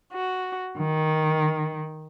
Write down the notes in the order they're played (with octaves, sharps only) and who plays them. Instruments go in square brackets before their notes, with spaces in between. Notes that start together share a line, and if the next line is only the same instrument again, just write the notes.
[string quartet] F#4
D#3